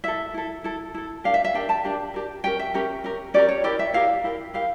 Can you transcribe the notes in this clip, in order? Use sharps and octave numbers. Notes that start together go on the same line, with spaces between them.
E4 A4 E5
E4 A4
E4 A4
E4 A4
D4 G4 A#4 F5
E5
E5
D4 G4 A#4 G5
A5
D4 G4 A#4
D4 G4 A#4
C#4 G4 A#4 G5
E5
C#4 G4 A#4
C#4 G4 A#4
C#4 G4 A#4 D5
C#5
E4 G4 A#4 D5
E5
E4 G4 A#4 F5
E4 G4 A#4
E4 G4 A#4 F5